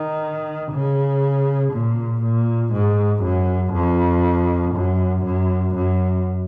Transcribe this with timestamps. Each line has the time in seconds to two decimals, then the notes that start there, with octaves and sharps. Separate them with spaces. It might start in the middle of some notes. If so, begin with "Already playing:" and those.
Already playing: D#3
0.71 C#3
1.73 A#2
2.23 A#2
2.73 G#2
3.24 F#2
3.74 F2
4.75 F#2
5.25 F#2
5.75 F#2